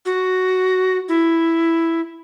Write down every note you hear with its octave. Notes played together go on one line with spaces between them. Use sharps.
F#4
E4